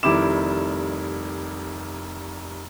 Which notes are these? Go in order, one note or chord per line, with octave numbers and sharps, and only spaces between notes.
F1 D#3 G3 E4 D6 E7